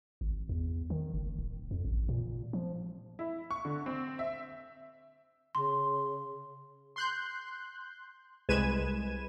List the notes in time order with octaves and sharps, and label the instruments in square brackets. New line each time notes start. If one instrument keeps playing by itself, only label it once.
[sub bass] G#1
E2
D#3
F#1
D1
F2
A1
A#2
F3
[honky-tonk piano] E4
C#6
D3
C4
E5
[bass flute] C#3 [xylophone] C6
[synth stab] C6 F#6 G6
C2 G#3 B4 G#6 D#7 E7